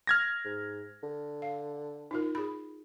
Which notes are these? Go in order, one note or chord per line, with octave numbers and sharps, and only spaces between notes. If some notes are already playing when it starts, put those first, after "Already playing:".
F6 G#6 A#6
G#2
D3
F5
D#4 F4 A#4
G#4 B5